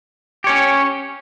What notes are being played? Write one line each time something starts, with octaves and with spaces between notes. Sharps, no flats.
C#4 G4 C#5